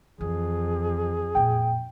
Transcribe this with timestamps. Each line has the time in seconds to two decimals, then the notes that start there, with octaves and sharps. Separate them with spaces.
0.21 F2 E3 G#4
1.35 F#2 A#2 G5